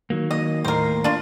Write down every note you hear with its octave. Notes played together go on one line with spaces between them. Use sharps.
D#3 F#3 A#3
D#5
D#2 A2 A#3 A#4 C5
D4 F4